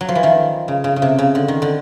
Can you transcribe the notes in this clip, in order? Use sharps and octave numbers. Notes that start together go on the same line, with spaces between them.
F#3
F3
E3
D#3 F3
C#3
C#3
C#3
C3
C#3
D3
D#3
D3